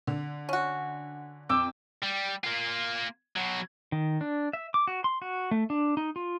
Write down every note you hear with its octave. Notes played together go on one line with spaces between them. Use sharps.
D3
C#4 F#4
F2 G5 D6 E6
G3
A#3 F4
B2 F#3
D#3
D4
E5
D6
F#4
C6
F#4
A3
D4
D#4
F4